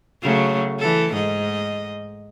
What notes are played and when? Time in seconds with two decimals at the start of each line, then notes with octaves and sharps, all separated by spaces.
0.22 C#3 F#3 A3
0.79 E3 A4
1.13 G#2 D#5